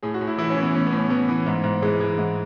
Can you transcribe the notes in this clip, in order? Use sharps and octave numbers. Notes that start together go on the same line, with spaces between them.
A2 G#4
F#4
A2
E4
E3 E4
C#4
E3
B3
A2 C#4
B3
A2
C#4
E3 B3
E3
G#2
G#2
E3 G#3
E3
G#2